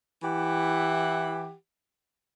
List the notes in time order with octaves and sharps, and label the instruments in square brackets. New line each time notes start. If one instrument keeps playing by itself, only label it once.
[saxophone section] E3 E4 G4 F#5